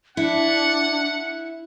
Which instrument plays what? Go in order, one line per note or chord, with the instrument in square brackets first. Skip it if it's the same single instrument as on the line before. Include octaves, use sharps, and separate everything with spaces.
[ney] D4 [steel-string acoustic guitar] E4 [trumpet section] F#5